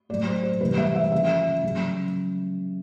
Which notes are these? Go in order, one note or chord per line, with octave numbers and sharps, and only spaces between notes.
A2 F#3 D5
C5
C5
C3 E3 G3 B4
E5
E5
C#3 F3 E5
C#3 F#3